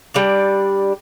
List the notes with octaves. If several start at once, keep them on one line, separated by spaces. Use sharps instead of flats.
G3 D4 D5